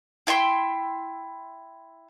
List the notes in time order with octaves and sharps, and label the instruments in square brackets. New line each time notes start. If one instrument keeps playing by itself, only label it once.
[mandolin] E4 E5 G5 C6